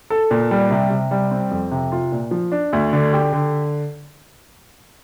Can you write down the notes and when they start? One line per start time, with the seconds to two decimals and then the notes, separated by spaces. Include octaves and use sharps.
0.10 A4
0.31 A#2
0.51 G3
0.70 C3
0.90 C3
1.11 G3
1.31 C4
1.51 F2
1.71 C3
1.92 F4
2.12 A#2
2.31 F3
2.52 D4
2.73 D2
2.93 D3
3.13 G4
3.33 D3